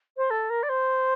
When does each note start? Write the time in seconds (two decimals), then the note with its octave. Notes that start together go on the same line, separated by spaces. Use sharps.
0.17 C5
0.30 A4
0.50 A#4
0.63 D5
0.69 C5